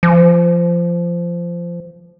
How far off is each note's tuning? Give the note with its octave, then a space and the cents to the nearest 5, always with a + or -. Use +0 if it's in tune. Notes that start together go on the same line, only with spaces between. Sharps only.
F3 -20